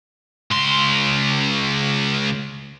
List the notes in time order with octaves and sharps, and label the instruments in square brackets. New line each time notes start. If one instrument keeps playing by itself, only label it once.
[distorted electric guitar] C#2 C6